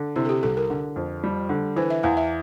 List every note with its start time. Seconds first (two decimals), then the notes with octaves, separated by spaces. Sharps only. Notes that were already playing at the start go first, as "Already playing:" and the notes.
Already playing: D3
0.16 C3 E4
0.25 A4
0.29 G4
0.43 C2 A4
0.57 A#4
0.70 D3
0.96 F2
1.24 G3
1.49 D3
1.76 E3 C5
1.90 E5
2.03 E2 F5
2.17 E5